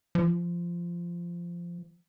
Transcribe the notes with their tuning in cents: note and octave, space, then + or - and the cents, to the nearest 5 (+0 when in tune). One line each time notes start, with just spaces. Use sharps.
F3 -15